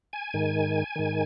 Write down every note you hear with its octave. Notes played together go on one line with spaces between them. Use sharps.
G#5
G#2 D#3
G#2 D#3